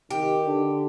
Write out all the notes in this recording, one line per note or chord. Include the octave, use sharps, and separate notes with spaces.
D#3 G4
D3